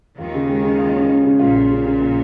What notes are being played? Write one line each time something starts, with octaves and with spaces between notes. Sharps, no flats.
D#2 D#3 F4
C#3
G#3
C#3
F4
C#4
C#4
C#3
A#1 A#2 F4
F4
C#3
C#3
F4